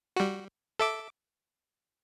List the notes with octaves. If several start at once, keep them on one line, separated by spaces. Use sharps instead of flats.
G3 F#4
A4 E5 D6